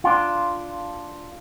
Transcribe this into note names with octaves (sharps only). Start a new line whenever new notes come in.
D4 F4